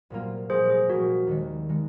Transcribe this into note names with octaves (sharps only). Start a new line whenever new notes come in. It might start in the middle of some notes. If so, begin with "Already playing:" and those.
C2 A#2 F#3 A#3 F4
C2 A#2 F3 G#4 C5
G#4
C2 A#2 F3 F#4 A#4
D#2 D#3 G#3
D#3 G#3